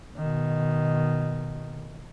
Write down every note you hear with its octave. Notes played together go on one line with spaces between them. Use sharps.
B2 D#3